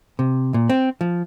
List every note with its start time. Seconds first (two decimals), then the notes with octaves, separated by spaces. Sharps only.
0.19 C3
0.54 A#2
0.70 C4
1.01 F3